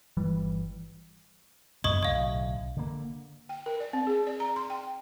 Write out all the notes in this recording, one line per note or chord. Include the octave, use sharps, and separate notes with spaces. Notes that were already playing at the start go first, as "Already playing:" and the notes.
G1 E3 G3
F#2 B3 D#5 C#6 D#6
B1 A2 D3 D#5 F5
D3 A#3
G5
A#4
D5
C4
G#4
D5
A#5
C6
G5